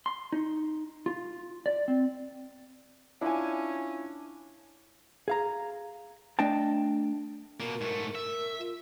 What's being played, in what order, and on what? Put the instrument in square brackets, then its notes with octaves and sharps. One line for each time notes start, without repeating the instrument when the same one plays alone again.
[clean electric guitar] C6
D#4
F4
D5
C4
[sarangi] C#4 [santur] D4 G#5 [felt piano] E4 F4
[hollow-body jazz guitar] G#4 F5 A#5
A3 D4 D#5 G5 A5
[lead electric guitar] B2 A#3 [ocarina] A#4
[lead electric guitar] G#2 A3
E5
[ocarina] F4